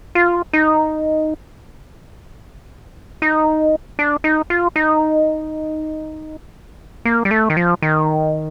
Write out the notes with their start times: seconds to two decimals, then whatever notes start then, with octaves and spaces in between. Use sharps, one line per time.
0.15 F4
0.53 D#4
3.22 D#4
3.99 D4
4.24 D#4
4.50 F4
4.76 D#4
7.05 A#3
7.25 G3
7.31 A3
7.50 D#3
7.57 F3
7.82 D#3